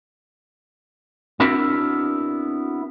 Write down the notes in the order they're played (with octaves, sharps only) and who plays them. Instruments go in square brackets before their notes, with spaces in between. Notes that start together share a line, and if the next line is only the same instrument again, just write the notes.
[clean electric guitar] B3 C4 D4 E4 F#4 A#4